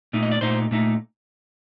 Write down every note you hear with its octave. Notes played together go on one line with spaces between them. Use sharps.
A#2 A3 D#4
D#5
D5
A#2 A3 D#4 C5
A#2 A3 D#4